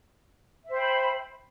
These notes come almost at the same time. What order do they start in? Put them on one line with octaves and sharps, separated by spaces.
E5 C5 G5 B5